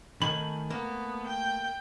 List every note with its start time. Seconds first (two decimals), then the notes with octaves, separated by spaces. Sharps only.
0.22 D#3 A3 G#5 B5 F#7
0.70 A#3 B3
1.27 G5